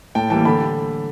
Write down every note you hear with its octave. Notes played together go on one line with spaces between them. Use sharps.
A2 G5 A5
E3 G3 A#3 G5 A5
D3 A5 B5